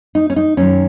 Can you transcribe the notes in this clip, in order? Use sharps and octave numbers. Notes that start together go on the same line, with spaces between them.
D#4
C#4
D#4
F#2 D#3 C#4